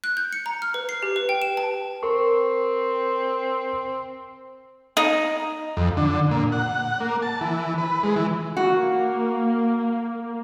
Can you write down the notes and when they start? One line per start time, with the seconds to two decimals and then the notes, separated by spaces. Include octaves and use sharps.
0.04 F#6
0.17 G6
0.33 C#7
0.46 A#5
0.62 F6
0.74 B4
0.89 C7
1.03 G4
1.16 B4
1.29 G5
1.42 E7
1.57 A5
2.03 C4 A#4 C#6
4.97 D#4
5.77 F2
5.97 D3
6.31 A#2
6.52 F#5
7.00 A#3
7.22 A5
7.41 E3
7.78 B4
8.03 G#3
8.16 E3
8.57 A#3 F#4